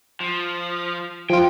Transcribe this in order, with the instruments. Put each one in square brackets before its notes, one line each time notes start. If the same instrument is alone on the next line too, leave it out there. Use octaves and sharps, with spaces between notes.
[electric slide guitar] F3
[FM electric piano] F3 F4 [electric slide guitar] G5